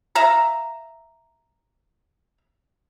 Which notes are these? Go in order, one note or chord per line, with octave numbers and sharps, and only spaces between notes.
E5 F5 A#5